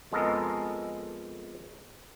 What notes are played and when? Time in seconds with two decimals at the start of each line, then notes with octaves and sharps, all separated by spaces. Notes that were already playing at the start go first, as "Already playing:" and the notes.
0.12 F2 G#3 B3 A4 A#4 D#5